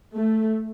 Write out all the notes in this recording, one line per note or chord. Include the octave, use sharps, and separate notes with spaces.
A3